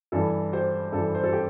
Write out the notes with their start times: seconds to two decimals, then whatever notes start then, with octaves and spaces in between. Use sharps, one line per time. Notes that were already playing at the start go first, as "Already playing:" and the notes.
0.12 G2 E3 A4
0.52 G4 C5
0.92 G2 E3 A4
1.15 C5
1.24 A4
1.33 G4